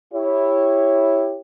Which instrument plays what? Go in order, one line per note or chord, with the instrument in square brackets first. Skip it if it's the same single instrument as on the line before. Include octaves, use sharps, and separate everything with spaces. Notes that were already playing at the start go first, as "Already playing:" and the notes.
[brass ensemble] E4 G4 C#5